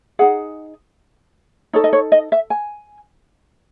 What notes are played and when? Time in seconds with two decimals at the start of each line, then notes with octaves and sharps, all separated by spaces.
0.19 D#4 G#4 F#5
1.73 D#4 A4 C#5
1.84 D#5
1.93 C#5
2.12 D#5
2.32 E5
2.50 G#5